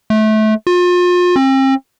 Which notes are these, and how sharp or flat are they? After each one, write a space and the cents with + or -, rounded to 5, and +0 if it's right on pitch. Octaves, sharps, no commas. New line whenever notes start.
A3 -25
F4 +35
C4 +40